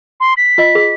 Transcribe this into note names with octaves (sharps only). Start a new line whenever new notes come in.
C6
B6
F4 D#5
G#4